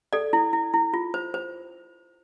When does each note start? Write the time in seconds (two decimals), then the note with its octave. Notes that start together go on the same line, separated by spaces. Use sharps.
0.13 A4 D5
0.33 E4
0.53 E4
0.74 E4
0.94 F4
1.14 C5
1.34 C5